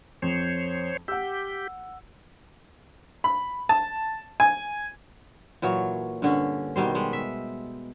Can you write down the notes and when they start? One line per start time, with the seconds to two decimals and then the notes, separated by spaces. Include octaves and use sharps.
0.22 F2 C5 C#5
1.08 G4 F#5 E6
3.24 B5
3.69 A5
4.40 G#5
5.62 A#2 E3 F#3 C#5
6.22 G2 D3 C#4
6.76 B2 D#3 G3 C5
6.95 G3 G#3
7.13 E5